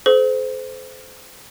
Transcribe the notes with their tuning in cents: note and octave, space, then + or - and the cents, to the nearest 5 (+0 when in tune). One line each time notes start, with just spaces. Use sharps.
A4 -40 C5 -25